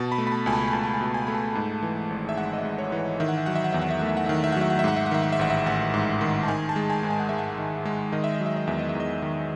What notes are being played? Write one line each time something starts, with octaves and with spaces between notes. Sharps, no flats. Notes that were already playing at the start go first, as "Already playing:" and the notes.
Already playing: B2 A5
B5
A3
B5
A5
C#2 G#5
A5
B5
C#2 A5
A5
G#5
B2
G#5
A3 B5
A5
G#2
E3
G#1
E5
G#3 F#5
D#5
E5
G#2
C#5
E3
C#5
D#3 E5
F#5
E5
F#3 F#5
E5
F#5
E2 E5
F#5
E5
A3 F#5
E5
F#5
D#3 E5
F#5
E5
F#5
F#3 E5
F#5
E5
G#2 F#5
E5
F#5
D#3 E5
F#5
E5
A1 F#5
E5
A1 F#5
G#2
D#3
A5
D#3 G#5
A5
G#3
G#5
G#2
G#5
F#5
G#2 E5
F#5
D#3
G#3
D#3 D#5
E5
D#5
F#3
E5
D#5
E2 E5
D#5
E5
E2
D#5
D#3